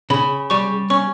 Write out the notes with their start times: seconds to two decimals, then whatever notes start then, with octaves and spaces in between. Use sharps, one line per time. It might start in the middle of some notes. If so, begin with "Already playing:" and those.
0.10 C#3 B5
0.50 G3 C#6
0.90 C#4 C#6